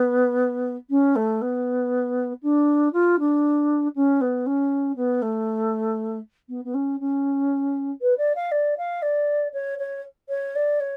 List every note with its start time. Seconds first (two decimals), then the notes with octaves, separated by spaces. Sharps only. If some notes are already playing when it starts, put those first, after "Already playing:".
Already playing: B3
0.90 C#4
1.16 A3
1.42 B3
2.43 D4
2.93 F4
3.19 D4
3.96 C#4
4.21 B3
4.46 C#4
4.96 B3
5.22 A3
6.49 B3
6.65 B3
6.74 C#4
7.00 C#4
8.02 B4
8.18 D5
8.36 F5
8.52 D5
8.78 F5
9.02 D5
9.54 C#5
9.79 C#5
10.29 C#5
10.56 D5
10.80 C#5